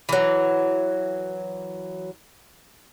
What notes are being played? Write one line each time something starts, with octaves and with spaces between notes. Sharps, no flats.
E3 F#3